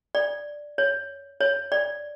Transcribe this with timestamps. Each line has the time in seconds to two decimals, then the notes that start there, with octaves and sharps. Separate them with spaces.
0.15 D5
0.78 C#5
1.41 C#5
1.72 D5